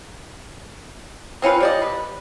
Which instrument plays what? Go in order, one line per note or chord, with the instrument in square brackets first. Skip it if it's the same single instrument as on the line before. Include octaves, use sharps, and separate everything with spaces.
[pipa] C4 C#4 F4 B4
G3 D5 D#5
B4